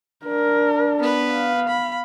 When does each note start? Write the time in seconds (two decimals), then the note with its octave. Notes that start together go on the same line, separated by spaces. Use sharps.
0.25 D4 A#4
0.99 B3 B4
1.32 F5
1.68 B5